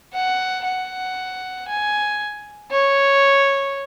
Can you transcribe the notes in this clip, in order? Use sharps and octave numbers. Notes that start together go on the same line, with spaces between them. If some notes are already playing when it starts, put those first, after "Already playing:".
F#5
F#5
G#5
C#5